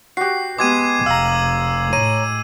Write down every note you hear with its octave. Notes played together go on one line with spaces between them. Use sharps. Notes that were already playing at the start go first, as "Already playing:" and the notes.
F#4 G4 C7
G#3 B3 G4 D6 G#6 D#7
F1 F5 A#5 E6 F#7
A2 C#5 A#5 D#7